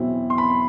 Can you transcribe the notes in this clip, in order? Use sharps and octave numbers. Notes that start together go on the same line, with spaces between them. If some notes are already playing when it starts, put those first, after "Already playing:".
Already playing: E2 B2 F#3 C4 E4
C6
B5